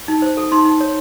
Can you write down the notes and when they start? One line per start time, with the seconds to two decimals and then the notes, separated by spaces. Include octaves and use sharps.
0.08 D#4
0.22 C5
0.37 A4
0.52 D#4 C6
0.65 D#4
0.81 C#5